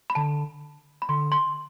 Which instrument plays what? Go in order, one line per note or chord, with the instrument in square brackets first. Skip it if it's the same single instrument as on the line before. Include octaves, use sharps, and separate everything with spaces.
[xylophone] B5
[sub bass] D3 [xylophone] A5
[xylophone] B5
[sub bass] D3 [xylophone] C6
[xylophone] C6